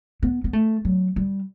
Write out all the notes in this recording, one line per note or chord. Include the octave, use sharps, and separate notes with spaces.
B3
B3
A3
F#3
G3